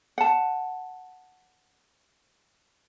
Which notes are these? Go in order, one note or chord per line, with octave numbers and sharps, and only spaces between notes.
F#5 A5